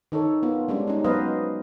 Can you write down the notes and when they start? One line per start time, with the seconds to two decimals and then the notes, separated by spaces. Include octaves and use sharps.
0.12 D#3 D#4 A4 C#5
0.43 B3 F4
0.68 G3 G#3 C#4 D4
0.87 C#4 D#4
1.04 F#3 B3 B4 C5 D#5 F5